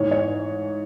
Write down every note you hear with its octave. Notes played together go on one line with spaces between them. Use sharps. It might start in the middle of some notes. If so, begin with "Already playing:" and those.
Already playing: G#2 E3 C#5
C#5